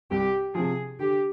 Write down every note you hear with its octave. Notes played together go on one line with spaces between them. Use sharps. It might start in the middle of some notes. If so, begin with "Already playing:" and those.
C2 G4
C3 F3 G#4
D3 G4